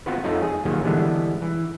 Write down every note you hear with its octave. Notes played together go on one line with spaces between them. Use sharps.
B3 C4 F4 F#4 B4
F2 A3 D#4 F4 C#5 F#5
G#4
D#2 A#2 D#3 F#3 A#3 G#4
D3 E3 G3 G#3 B3 D4
E3